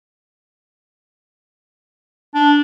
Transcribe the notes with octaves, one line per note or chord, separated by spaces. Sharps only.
D4